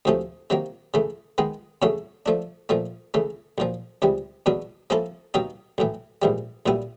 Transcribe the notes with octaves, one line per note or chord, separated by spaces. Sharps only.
D2 C3 F3 A3 C#4
C3 D#3 F#3 A#3
C#3 E3 A3
D#3 G#3 B3
E2 C#3 F#3 A3 C#4
F3 A3 D4
A#2 F3 A3
C#3 E3 A3
B1 A#2 F3
C#2 C3 E3 G3
E2 B2 F#3 B3 D4
F3 A#3 C#4 E4 A4
B2 F#3 A#3 D#4 G4
B1 A2 E3
A#1 G#2 E3 G3
B1 A#2 G3 B3 E4